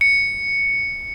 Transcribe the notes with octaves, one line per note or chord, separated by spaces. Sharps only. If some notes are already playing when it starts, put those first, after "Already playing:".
C#7